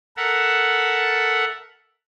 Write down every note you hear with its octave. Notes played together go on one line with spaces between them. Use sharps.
A4 A#4 E5 F#5